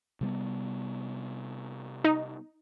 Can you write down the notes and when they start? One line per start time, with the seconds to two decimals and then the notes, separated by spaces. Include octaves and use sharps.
0.21 C3 G3 B3
2.04 D#4